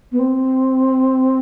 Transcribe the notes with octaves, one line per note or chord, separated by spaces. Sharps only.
B3
C4